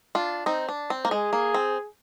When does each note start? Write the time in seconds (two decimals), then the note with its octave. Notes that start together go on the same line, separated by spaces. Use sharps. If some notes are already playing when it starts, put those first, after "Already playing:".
0.15 D4 F4
0.46 C4 D#4
0.69 D4
0.90 C4
1.05 A#3
1.11 G#3 G#4
1.33 A#3
1.54 C4